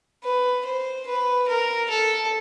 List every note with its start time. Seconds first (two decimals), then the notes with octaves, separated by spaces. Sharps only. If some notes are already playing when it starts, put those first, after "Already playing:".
0.24 B4
0.66 C5
1.07 B4
1.48 A#4
1.90 A4